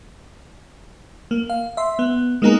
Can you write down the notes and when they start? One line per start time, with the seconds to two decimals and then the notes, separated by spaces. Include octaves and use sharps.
1.31 A#3
1.50 F5
1.77 E5 C6
1.99 B3
2.42 G#3 A#3 B3 D#4 G#4 A#4